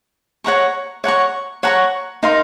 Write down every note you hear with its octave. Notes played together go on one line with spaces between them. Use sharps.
C#5 F#5 A#5 C#6
C#5 F#5 A#5 C#6
C#5 F#5 A#5 C#6
D#4 A#4 F5 C6